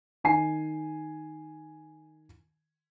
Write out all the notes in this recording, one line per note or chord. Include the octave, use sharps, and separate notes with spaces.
D#3 G#5 C7